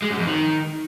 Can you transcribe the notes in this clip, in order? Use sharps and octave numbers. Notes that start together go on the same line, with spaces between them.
G#3
F#2
F2
D#3